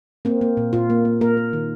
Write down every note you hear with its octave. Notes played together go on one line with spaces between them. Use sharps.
A#3 C4
A#3
A#2
A#2 F4
A#3
A#3
A#3 A#4
A#3
D#3